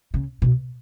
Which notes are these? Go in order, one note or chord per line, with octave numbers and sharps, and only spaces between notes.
C#3
B2